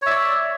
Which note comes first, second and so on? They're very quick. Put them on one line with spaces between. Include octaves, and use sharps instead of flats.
C#5 E5 D5